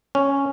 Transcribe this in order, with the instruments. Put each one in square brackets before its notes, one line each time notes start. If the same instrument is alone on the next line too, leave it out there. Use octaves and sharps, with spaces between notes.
[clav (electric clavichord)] C#4